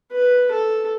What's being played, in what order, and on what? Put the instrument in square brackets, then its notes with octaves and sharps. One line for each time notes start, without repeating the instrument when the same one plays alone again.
[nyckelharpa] B4
A4